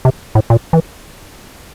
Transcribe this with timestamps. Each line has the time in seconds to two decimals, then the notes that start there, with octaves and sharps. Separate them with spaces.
0.05 C3
0.35 A2
0.50 A#2
0.73 E3